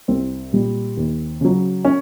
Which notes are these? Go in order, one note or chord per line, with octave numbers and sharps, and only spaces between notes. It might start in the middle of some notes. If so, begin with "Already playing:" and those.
C2 C4
A#2 G3
D#2
C#3 F#3
C#4